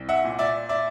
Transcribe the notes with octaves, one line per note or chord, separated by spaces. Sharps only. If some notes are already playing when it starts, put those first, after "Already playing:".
Already playing: C2
E5 F#5
A#2
D5 E5
D5 E5